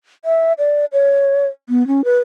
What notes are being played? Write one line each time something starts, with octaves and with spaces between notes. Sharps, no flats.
E5
D5
C#5
B3
C#4
B4